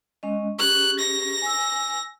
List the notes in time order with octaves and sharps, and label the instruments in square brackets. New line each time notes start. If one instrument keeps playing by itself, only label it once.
[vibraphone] G#3 C#4 D#5
[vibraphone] C#4 G4 G#4 [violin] F#6
[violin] A#6
[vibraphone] G#5 E6